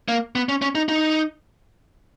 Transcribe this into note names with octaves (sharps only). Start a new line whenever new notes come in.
A#3
B3
C#4
C#4
D#4
D#4